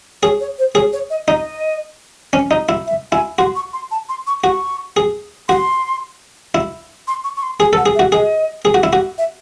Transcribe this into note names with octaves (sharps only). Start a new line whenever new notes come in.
G#4 C#5
C#5
C5
G#4 C#5
C#5
D#5
D#4 D#5
C#4
D#4
E4
E5
E4 G#5
F#4 C6
C#6
C6
A5
C6
C#6
F#4 C#6
G#4
F#4 C6
E4
C6
C#6
C#6
C6
G#4 G#5
A4 F#5
G#4
E5
F#4
G#4 D#5
G#4
F#4
E4
F#4
E5